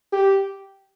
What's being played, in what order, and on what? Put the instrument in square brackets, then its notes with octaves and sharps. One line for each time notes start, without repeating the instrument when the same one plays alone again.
[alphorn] G4